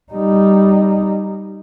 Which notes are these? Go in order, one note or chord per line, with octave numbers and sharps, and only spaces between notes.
G3 D#4